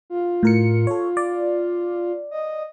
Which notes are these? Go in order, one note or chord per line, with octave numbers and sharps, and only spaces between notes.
F4
A2 A#4 C#7
A4 C#5
D5
D#5